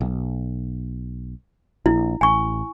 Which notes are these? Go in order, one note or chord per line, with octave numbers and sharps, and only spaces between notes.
B1
A#1 E4
A1 G#5 C#6